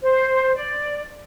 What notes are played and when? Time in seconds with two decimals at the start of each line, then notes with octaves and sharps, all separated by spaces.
0.02 C5
0.56 D5